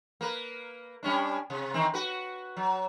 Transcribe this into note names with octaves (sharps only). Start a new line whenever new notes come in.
A#3 B4
G3 C#4 D4
C3
D#3 E3 C4
F#4 B4
F#3